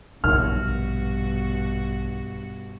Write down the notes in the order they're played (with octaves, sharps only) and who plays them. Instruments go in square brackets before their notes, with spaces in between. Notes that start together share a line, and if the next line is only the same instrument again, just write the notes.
[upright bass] A#1 [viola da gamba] G2 B2 F#4 [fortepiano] F6